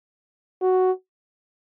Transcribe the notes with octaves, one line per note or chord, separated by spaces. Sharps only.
F#4